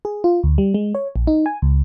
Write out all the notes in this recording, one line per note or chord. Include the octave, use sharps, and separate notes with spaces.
G#4
F4
D2
G3
G#3
C#5
A#1
D#4
G#5
C#2